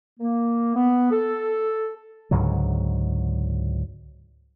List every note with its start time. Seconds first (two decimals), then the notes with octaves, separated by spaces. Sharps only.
0.20 A#3
0.76 B3
1.11 A4
2.31 C#2 G#2 D3 F#3